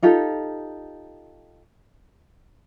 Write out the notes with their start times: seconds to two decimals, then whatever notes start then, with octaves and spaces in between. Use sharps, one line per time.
0.03 D#4 F4 G4 A4